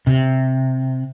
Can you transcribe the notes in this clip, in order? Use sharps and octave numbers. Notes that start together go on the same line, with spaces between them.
C3